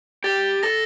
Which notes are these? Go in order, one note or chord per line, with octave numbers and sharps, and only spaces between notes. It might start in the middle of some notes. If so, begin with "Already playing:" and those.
G4 A6
A4 A#6